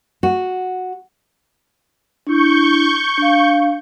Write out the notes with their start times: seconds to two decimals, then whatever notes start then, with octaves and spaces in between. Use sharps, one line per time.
0.23 F#4
2.27 D4 E4 C#6 G6
3.18 D4 F5